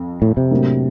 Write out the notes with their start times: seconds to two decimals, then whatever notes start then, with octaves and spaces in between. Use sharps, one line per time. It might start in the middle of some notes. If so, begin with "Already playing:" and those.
Already playing: F2
0.22 A2
0.37 C3
0.51 A2 F#3 A#3 D4